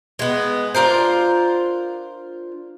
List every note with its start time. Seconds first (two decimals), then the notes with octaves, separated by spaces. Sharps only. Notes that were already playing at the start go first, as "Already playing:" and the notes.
0.19 G#3 B3
0.75 D4 F4 A#4 C5